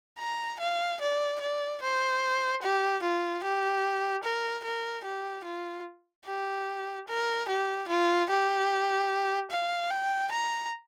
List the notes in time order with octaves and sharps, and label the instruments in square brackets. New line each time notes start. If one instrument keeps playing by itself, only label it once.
[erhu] A#5
F5
D5
D5
C5
G4
F4
G4
A#4
A#4
G4
F4
G4
A#4
G4
F4
G4
F5
G5
A#5